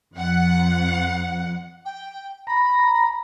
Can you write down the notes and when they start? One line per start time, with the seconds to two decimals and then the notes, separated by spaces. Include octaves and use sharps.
0.15 F2 F#5
1.85 G5
2.47 A#5 B5